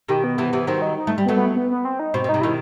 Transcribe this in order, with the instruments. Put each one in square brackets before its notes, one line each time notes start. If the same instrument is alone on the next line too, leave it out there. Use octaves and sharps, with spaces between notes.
[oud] B2 D#3 [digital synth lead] G4
[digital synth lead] B3
[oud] C3 E3
C3 E3
[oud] D#3 F#3 [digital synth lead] C4
[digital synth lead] D#4
D#4
[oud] A3
G3
[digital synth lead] B3
[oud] F#3 A3
[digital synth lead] B3
B3
B3
C4
D#4
[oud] B2 [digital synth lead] C4
[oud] B2
[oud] C3 [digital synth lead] D#4
[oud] B2 D#3 [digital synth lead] E4